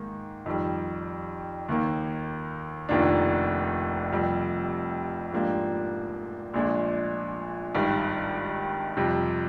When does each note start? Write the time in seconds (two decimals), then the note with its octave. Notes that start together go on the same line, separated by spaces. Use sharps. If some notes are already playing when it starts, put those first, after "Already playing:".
Already playing: G#2 D#3 A#3
0.46 F2 D#3 G3
1.68 D#2 D#3 A#3
2.89 F1 F2 D#3 A#3 D4
4.11 F1 F2 C3 G3
5.32 G#2 F3 A#3 D4 G4
6.54 A#1 A#2 G#3 D4
7.75 G#1 G2 D#3 G3
8.97 F2 C3 G3